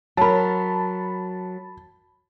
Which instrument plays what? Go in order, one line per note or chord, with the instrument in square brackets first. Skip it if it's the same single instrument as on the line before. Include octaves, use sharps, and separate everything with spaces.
[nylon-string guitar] F#3 A#4 [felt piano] A5 B5